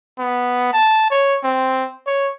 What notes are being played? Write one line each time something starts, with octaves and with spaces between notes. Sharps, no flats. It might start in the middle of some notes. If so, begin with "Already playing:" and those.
B3
A5
C#5
C4
C#5